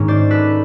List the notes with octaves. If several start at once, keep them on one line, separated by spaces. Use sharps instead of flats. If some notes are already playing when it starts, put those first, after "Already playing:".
Already playing: G#2 D#3 G#3 A#3 C#4
C5 D5
A4 B4